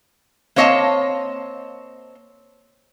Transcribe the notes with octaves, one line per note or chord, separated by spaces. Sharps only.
A#3 C4 C#5 D#5 F5 A5